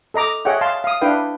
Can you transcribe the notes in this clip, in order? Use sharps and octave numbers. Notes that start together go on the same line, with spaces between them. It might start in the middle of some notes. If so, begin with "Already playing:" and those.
A4 D#5 A#5 D6
G#4 C#5 D#5 E5 F#5 G5
F5 A5 C6
F5 D#6
D4 E4 B4 F5 G5